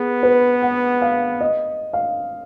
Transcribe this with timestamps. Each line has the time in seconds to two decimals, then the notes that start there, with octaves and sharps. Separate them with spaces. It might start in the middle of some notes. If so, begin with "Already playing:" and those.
Already playing: B3 G#4
0.23 B4
0.62 F#5
1.02 F5
1.41 D#5
1.93 F5